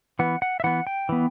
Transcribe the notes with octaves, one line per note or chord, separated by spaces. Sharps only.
E3 B3 F#5
F#5
E5
E3 B3 F#5
G5
E3 B3